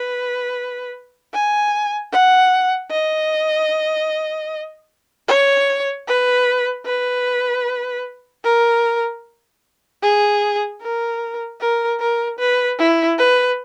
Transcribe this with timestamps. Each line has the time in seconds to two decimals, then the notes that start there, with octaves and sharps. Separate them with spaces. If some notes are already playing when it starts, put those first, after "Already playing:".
Already playing: B4
1.34 G#5
2.12 F#5
2.91 D#5
5.28 C#5
6.08 B4
6.86 B4
8.44 A#4
10.03 G#4
10.82 A#4
11.60 A#4
12.00 A#4
12.39 B4
12.79 E4
13.18 B4